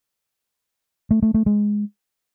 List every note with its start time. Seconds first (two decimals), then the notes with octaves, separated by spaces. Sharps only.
1.11 A3
1.23 A3
1.34 A3
1.46 G#3